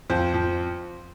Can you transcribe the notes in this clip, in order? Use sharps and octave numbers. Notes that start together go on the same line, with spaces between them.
F2 C5
F2